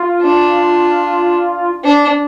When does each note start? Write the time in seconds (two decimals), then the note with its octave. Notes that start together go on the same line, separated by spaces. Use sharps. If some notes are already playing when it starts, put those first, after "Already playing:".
Already playing: F4
0.22 D4
1.84 D4